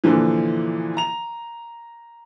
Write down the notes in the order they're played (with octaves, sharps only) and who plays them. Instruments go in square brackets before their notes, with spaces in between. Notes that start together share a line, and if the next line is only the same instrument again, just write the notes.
[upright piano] A#2 D3 E3 F3
A#5 F7